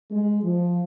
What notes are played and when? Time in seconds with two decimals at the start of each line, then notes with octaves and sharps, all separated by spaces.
0.11 G#3
0.44 F3